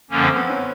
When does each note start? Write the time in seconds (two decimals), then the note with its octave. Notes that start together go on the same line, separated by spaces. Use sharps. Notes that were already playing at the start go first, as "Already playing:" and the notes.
0.10 F#2 D3 F3 A#3 C#4
0.23 C4
0.36 B3
0.50 C#4